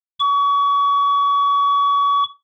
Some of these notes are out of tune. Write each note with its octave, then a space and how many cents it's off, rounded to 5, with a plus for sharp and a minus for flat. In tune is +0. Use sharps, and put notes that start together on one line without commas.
C#6 +35